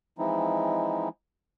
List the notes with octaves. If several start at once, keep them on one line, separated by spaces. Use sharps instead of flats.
E3 F3 G#3 C4 D#4 E4